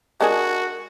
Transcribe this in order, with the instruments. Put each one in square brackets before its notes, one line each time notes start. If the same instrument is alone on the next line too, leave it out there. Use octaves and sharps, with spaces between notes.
[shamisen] G#3 D4 G#4 [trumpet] F#4 [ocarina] A#4